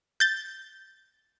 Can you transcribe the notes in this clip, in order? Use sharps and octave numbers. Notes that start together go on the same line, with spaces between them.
G6 A6